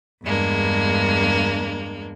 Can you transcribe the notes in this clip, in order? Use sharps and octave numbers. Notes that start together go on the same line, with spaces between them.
E2 G2 G#3 A#3 D4